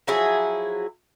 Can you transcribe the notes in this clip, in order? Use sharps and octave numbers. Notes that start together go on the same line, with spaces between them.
F3 F#3 E4 G#4